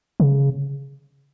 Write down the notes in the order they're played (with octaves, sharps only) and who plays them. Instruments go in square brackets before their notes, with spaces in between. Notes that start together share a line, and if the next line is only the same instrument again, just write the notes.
[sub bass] C#3